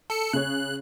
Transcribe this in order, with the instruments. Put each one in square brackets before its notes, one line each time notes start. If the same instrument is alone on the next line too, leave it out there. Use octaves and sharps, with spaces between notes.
[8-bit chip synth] A4 C#7
[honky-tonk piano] C#3 G#4 C#5 [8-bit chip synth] F#6